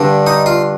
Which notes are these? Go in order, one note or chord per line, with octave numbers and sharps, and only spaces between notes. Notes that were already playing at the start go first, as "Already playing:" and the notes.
Already playing: G2 D3
D#4
F4